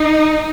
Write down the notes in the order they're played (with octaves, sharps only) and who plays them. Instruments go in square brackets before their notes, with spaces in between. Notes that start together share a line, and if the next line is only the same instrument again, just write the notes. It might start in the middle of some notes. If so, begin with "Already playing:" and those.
Already playing: [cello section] D#4